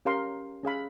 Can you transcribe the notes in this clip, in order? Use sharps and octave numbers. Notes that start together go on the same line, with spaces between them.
C#4 G4 A#4 F5 A#5 C6
C#4 G#4 F5 B5